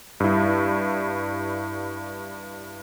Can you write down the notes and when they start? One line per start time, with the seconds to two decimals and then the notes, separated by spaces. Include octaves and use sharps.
0.20 G2 E4